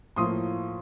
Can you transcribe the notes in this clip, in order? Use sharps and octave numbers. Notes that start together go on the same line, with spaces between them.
A2 F3 A#3 C6 D#6